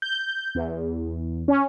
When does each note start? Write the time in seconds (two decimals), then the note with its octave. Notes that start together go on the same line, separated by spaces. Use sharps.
0.02 G6
0.55 E2
1.48 C#4